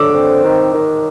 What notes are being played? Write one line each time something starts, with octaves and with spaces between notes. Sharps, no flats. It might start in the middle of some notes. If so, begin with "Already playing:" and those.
Already playing: D3 D6 E6
C4
D#3
D#3